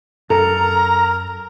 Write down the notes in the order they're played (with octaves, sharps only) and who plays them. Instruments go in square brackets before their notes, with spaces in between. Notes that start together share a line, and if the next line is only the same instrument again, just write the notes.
[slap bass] F#2 [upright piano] A4 [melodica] A#4 [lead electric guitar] A#5